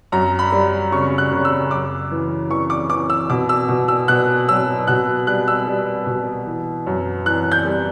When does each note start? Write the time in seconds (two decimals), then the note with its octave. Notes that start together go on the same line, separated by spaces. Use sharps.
0.12 F#2 A#5
0.39 B5
0.52 G3
0.92 C#3 C#6
1.18 F#6
1.32 C#3
1.45 E6
1.71 F#2 D6
2.11 E3
2.50 E3 C#6
2.70 D6
2.90 E3 D6
3.10 E6
3.29 B2 D6
3.49 E6
3.69 B2
3.88 E6
4.08 B2 F#6
4.49 F#3 E6
4.87 B2 F#6
5.27 G3 F#6
5.48 E6
5.67 G3
6.06 B2
6.46 E3
6.87 F#2
7.26 E3 F#6
7.52 G6
7.65 G3